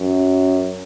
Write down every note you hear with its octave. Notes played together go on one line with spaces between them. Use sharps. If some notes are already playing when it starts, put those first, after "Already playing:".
Already playing: F#2